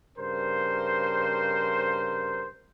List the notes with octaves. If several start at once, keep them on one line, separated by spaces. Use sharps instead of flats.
G2 C#3 A#4 C5